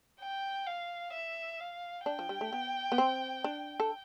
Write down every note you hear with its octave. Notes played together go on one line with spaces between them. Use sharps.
G5
F5
E5
F5
D4 G5
F3
G3
A3
B3
B3
C4
D4
A4